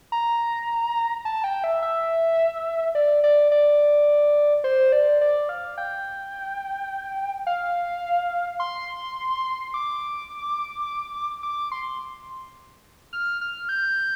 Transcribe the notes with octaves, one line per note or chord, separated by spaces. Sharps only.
A#5
A5
G5
E5
E5
D5
D5
D5
C5
D5
D5
F5
G5
F5
C6
D6
D6
C6
F6
F6
G6